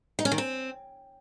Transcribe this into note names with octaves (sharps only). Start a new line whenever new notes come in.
D#4
C#4
D#3
C4